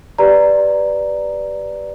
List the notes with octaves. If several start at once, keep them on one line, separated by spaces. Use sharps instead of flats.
G4 B4 D5 A#5